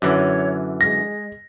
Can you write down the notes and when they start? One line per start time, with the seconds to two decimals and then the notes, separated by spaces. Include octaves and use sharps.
0.02 F#2 D3 E3 C#5
0.81 G#3 A#6